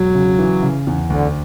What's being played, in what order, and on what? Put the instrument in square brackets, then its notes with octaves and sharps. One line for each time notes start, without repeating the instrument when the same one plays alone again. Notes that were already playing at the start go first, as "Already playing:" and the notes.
Already playing: [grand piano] E1 [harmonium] F#3
[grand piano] C#3
E3
C#3
E2
[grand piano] D2 [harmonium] D3